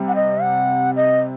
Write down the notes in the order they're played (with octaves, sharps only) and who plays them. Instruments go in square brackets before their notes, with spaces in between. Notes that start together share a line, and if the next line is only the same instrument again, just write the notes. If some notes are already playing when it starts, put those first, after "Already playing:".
Already playing: [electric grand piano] C3 G3 C4
[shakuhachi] F#5
D#5
F#5
D#5